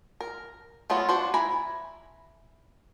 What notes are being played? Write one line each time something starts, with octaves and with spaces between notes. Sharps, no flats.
A#4
F#3 A3 B3 F4
D4 F#4 C5
E4 G#5 A#5 B5